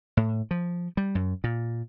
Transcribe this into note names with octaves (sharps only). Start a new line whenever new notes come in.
A2
F3
G3
F#2
A#2